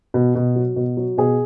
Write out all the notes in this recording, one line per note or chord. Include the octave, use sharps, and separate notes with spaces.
B2
B2
F#3
B2
F#3
B2 G#4